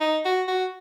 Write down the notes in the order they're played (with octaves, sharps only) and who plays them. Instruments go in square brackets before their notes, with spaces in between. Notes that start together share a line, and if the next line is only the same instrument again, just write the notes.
[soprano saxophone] D#4
F#4
F#4